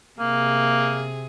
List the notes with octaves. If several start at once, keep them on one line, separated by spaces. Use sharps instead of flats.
C3 A#3 G#4